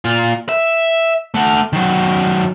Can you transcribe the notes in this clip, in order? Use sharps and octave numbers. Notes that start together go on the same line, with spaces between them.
A#2 F4
E5
A3 F#5
D#3 F#3